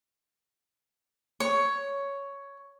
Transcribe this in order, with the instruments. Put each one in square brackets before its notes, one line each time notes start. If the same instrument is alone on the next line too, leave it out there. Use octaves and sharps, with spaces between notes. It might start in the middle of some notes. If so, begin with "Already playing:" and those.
[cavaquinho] C#5